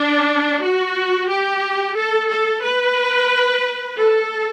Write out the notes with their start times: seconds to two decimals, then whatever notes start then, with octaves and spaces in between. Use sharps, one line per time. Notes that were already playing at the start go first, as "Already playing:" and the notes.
Already playing: D4
0.63 F#4
1.29 G4
1.96 A4
2.30 A4
2.63 B4
3.98 A4